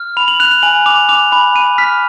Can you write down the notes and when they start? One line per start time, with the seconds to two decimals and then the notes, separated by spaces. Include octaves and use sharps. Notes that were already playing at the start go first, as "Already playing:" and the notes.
Already playing: F6
0.17 B5 F7
0.28 F#7
0.40 F#6 F7
0.52 F7
0.63 G#5 F#7
0.86 D6 F7
1.09 D6 F7
1.32 B5 F7
1.55 B5 D#7
1.78 F6 B6